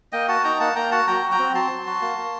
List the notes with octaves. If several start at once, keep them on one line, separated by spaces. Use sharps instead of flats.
A#3 D#5 G5
F#4 F#5 A5
D#4 G5 A#5
A#3 F#5 A5
A#3 G5 A#5
F#4 F#5 A5
F#3 G5 A#5
F#4
G5 A#5
C4
F#3 A5 C6
F#3
F#4
A#3
A#3